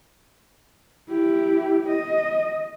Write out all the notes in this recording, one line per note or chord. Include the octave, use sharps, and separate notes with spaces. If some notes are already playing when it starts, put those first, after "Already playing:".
E4 G4
D#5